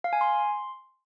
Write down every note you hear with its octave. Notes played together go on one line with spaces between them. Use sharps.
F5
G#5
C6